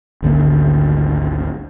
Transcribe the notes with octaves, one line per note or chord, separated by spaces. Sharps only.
G#1 D2 D3 A#3